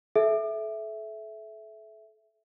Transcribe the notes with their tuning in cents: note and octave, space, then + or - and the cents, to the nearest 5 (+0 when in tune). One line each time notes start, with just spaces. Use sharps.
A4 -35 E5 +0